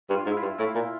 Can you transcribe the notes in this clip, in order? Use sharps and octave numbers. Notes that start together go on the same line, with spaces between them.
G2
F4
G#2
E4
F4
G2
A2 E4
A#2